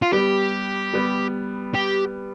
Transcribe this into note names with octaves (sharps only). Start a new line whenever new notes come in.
F4
G3 B3 G4
G3 B3
G4